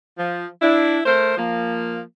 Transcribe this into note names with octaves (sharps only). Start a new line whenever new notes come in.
F3
D4 E4
A3 A#4 C5
F3 A#3